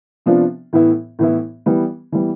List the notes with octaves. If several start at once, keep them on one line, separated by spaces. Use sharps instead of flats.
C3 F3 B3 D4 F4
A2 E3 B3 E4
A2 E3 B3 E4
E3 G3 B3
E3 G3 B3